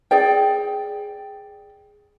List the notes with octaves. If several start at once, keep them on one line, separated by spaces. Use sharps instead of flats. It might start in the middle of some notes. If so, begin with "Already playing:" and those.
G#4 D5 G5